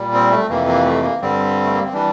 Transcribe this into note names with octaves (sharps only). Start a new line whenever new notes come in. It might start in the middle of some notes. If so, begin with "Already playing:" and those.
Already playing: A#2 G3
C4
A3
F2 C3 E3 A#3
A#3
A3
A#3
G2 D3 G3 C4
A3
A#3
C4
E3 G3 D4